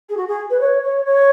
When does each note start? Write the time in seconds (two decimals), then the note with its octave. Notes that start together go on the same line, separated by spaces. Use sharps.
0.09 G#4
0.17 F#4
0.27 G#4
0.50 B4
0.60 C#5
0.82 C#5
1.05 C#5